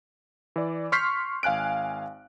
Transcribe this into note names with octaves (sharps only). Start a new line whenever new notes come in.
E3 D5
C6 C#6 F6 G6 B6 C7
G#1 F5 G#5 F#6 D7